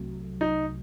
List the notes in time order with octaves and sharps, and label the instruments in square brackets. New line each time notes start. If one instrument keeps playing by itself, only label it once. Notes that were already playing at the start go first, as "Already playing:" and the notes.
Already playing: [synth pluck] C2 C3 F#3 A3
[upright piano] D#4